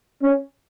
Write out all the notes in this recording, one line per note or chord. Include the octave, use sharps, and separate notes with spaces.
C#4